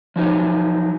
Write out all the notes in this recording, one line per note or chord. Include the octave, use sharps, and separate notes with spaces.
F3 F#3 D#4